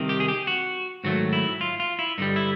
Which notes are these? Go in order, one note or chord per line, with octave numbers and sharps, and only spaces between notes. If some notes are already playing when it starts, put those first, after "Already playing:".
Already playing: C2 C3 D#3
G4
G#4
G4
F#4
G#2 D#3 F#3 A3 F#4
E4
F4
F4
E4
G2 D3 G3 D#4
E4